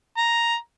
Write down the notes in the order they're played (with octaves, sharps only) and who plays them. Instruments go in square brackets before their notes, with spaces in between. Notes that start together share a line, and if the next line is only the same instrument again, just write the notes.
[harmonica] A#5